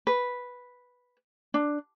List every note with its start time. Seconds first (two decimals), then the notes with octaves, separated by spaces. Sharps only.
0.07 B4
1.54 D4